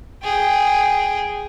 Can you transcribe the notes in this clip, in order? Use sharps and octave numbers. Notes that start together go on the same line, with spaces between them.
G#4 G5